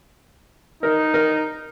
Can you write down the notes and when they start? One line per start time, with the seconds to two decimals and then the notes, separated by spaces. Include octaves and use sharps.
0.83 D#4 A#4
1.14 A#4